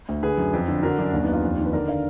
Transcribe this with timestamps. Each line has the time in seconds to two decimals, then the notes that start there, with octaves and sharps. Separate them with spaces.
0.09 D2
0.23 D3 G#4 B4
0.37 F#2
0.53 F2
0.68 D3
0.83 D3 F#4 A#4
0.98 F#2 D4
1.13 D#2 D4
1.24 B3 D#4
1.28 D#2
1.33 D4 F4
1.44 F2
1.59 D#3
1.65 B4
1.73 D3 A#4 D5
1.88 D3 D5 F5